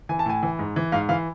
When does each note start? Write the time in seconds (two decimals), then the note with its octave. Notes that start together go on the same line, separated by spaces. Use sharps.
0.09 E3 G#5
0.19 A5
0.26 A2 G#5
0.43 E3
0.59 G#2
0.76 E3
0.92 G#2 F5
1.09 E3 F5